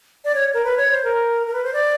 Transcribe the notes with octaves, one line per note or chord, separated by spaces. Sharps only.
D5
C#5
A#4
B4
C#5
C5
A#4
A#4
B4
C5
D5